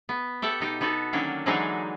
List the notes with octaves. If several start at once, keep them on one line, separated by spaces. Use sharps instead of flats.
B3
G4 A4 E5 F#5
B2 D#4 G4
B3 D#4 F#4 A4
D3 D#3 F#3 A#3 C#4 D4
D3 E3 F#3 G#3 D4 D#4